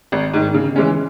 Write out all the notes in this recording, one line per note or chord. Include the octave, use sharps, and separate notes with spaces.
G#1
G#2 D#3
C#3
E3 G#3 C#4